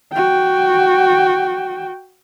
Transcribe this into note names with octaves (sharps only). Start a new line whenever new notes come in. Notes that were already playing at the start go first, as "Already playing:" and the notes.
F#4 G5